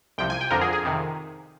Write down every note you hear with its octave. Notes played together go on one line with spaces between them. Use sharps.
C2 C3 F3 G5
G#5
G5
F2 D3 F3 A#4
G#4
G#4
F2 C3 D#3